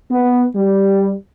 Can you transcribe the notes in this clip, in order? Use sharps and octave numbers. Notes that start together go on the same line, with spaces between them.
B3
G3